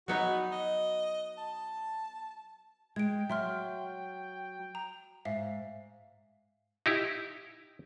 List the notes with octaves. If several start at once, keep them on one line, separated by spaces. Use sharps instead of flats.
F#3 B3 D#4 F#4
D#5
A5
G#3 G5 G#6 D7
F#3 E5 C6 F6
A#5
G#2 E5 F5
D#4 E4 G4